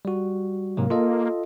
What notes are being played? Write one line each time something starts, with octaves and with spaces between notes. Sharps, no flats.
G3 F#4
G#2 C3 F#3 A#3
F4 A4 D#5